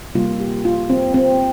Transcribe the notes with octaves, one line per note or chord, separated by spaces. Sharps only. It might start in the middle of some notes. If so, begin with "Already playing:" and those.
C3 G3 A#3 F4
G4
F4
C4
C4